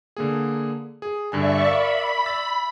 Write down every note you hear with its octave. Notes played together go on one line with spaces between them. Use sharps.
D3 A#3 G#4
G#4
G2 D3 D5 E5 G#5 C#6
A#4 E5 F5 B5
E6 A6